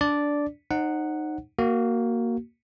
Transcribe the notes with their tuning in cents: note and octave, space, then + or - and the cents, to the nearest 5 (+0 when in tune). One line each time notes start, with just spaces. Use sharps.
D4 -10 D5 -5
D#4 -20 C5 +35 F#5 +0
A#3 +0 F#4 +15